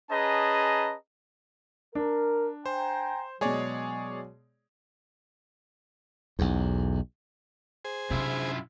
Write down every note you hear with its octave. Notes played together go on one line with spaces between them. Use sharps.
C#4 G#4 B4 D#5 A5 A#5
D4 A#4
C5 G5 G#5 A#5
B2 F#3 G#3 G#4 C#5 D5
B1 E2
G#4 C5 G#5
F#2 C3 D4 E4 F4